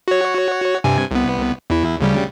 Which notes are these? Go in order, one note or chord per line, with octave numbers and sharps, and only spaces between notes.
F#4 C#5
G2 C3 G#5
C2 B3
E2 E4
D2 C#3 G3